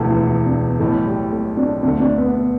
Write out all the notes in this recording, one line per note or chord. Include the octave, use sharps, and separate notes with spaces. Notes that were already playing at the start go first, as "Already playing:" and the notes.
Already playing: E1 D2 D3 E3 A3
E3
E3
D4
B3
B1 A2 E3 A3
G3
A3
D4
D2 D3 A3 D4
D4
B3
B3